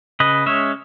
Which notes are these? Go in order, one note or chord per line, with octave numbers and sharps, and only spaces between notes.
C#3 B4 D#5
G#3 C#4 C#5 E5